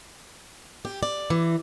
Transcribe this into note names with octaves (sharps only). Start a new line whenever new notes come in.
G4
D5
E3